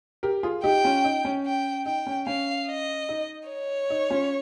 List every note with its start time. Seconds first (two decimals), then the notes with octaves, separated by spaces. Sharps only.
0.23 G4 A#4
0.43 F4 G#4
0.63 D#4 G4 G5
0.84 C#4 F4
1.04 D#4
1.25 C#4
1.46 G5
1.86 D#4 G5
2.07 C#4
2.27 C#4 F5
2.67 D#5
3.09 D#4
3.48 C#5
3.90 D#4
4.10 C#4 F4